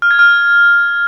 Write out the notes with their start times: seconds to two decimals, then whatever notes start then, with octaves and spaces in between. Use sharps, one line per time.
0.02 F6
0.11 G#6
0.19 F6